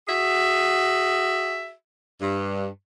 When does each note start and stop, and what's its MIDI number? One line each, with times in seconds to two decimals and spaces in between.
0.08 1.72 66
0.08 1.72 68
0.08 1.72 76
2.21 2.67 43